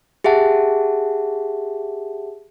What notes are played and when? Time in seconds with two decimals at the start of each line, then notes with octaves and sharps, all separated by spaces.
0.24 G4 G#4 E5 F#5 A5